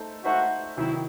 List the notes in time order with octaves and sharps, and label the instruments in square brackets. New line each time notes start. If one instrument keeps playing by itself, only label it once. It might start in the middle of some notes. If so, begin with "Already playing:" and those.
Already playing: [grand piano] A3 D#4 A4 C5 E5
[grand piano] A3 D#4 A4 C5 E5 [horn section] F#4
[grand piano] C3 D#3 F#3 [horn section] E4